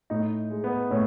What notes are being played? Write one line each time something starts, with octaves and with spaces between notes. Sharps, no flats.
A2 D#4
G#3
B3
A2 C#4